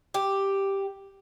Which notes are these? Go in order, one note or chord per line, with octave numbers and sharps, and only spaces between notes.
G4